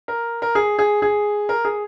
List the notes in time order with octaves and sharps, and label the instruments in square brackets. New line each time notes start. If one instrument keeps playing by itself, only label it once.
[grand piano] A#4
A#4
G#4
G#4
G#4
A#4
G#4